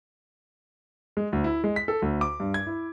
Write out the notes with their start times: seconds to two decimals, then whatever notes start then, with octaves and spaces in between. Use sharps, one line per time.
1.17 G#3
1.33 D2
1.44 E4
1.64 G#3
1.76 B6
1.88 A4
2.02 D2
2.21 D6
2.40 G2
2.54 G#6
2.67 E4